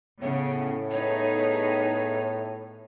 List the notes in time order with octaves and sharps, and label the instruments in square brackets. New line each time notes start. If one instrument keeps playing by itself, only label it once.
[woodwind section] A2 [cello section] C#3 [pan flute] B3
[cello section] B3 D#4 G#4 [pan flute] C#5